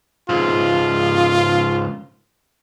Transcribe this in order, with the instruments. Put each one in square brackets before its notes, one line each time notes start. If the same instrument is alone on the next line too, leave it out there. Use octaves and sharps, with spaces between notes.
[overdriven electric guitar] C#2 G#2 [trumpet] F4